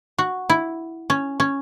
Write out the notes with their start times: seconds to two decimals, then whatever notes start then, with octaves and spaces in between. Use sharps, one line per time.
0.18 F#4
0.50 E4
1.10 C#4
1.40 C#4